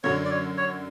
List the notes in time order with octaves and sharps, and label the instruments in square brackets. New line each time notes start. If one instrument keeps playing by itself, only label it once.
[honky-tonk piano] F#2 D3 F#3 [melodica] C#5
[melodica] D5
C#5
C#5